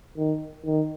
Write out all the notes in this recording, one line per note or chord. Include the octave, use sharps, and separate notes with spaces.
D#3
D#3